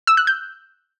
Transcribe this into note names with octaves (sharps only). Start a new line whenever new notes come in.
E6
F#6
G6